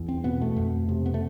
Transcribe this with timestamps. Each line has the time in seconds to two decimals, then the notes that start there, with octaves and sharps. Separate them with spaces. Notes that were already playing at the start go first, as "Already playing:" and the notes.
Already playing: E2
0.09 C4
0.24 B2 B3
0.41 A3
0.56 F2
0.89 C3
1.06 B3
1.14 A3